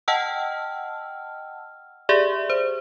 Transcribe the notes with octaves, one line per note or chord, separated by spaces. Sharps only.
D#5 F#5 G5 A5 E6 F6
G4 G#4 D5 E5
C5